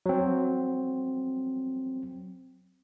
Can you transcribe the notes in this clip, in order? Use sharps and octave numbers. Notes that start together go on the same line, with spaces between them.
F#3 C4